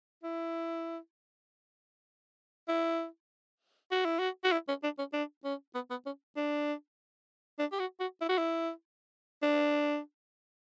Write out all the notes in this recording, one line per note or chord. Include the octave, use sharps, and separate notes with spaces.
E4
E4
F#4
E4
F#4
F#4
E4
C#4
D4
C#4
D4
C#4
B3
B3
C#4
D4
D4
G4
F#4
F#4
E4
F#4
E4
D4